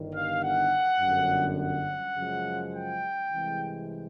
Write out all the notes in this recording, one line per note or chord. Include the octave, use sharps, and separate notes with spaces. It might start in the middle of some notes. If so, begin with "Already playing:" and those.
Already playing: G1 G2 D#3
F5
F#5
G1 F#2 D3
F#5
F#2 C#3 F3 G#3
G5
C2 C3 E3 G#3